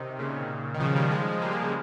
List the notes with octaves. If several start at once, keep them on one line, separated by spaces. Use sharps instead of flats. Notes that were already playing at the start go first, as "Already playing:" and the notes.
Already playing: C3 D#3
A#2 C#3
D#3
C#3 F3
D#3 G3
F3 G#3
G#3
G3 A#3
F3 G#3
C#3 F3